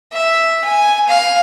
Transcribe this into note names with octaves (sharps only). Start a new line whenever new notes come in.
E5
G#5
F5